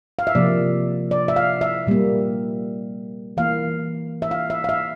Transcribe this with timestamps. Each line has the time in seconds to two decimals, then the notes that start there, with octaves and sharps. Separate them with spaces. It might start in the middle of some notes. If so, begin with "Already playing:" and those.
0.19 F5
0.27 E5
0.35 C3 F3 A#3 D5
1.11 D5
1.28 E5
1.36 F5
1.61 E5
1.87 A#2 G3 A#3
3.37 E3 A#3 F5
4.22 E5
4.31 F5
4.50 E5
4.64 F5
4.69 E5